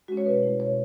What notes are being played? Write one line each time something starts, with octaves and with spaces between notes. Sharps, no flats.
G#3 C#4 F#4
C#5
B2 B4
A3 E4
B2 C#5